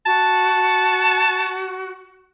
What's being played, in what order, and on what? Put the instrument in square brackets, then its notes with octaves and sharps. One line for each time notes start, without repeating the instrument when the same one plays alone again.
[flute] F#4 [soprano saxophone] A5